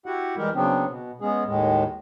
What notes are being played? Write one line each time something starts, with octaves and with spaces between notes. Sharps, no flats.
E4 F#4 G4 F#5
E3 G3 G#3 G4 A#4
C#3 F#3 B3 C4 D4
B2
G#3 B3 C#4 G#4
D#2 A2 G#3